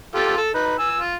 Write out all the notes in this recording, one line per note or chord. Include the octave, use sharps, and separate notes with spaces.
F4 G4 A4
A4 A5
D#4 B4
G#5 E6
F4